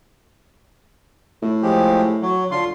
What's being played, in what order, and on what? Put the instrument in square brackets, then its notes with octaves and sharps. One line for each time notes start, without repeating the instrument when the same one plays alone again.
[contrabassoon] A2
[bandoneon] F3 G#3 G4
F#3
D3 F4 C6